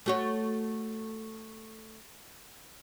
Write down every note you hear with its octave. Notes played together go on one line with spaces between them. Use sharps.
A3 F#4 C#5